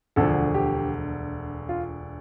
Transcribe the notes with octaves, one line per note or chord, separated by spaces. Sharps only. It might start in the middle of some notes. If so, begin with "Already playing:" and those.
E1 D2 D3 F3 A4
G4
F4